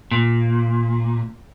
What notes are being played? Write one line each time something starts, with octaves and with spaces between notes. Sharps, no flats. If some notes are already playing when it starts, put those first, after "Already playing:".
A#2